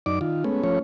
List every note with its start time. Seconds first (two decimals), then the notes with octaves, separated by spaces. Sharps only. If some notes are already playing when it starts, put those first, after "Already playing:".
0.06 F#2 D#4 D5 D6
0.21 D#3 F4
0.44 G#3 A3 B3 C#4
0.63 F3 A3 C#4 C#5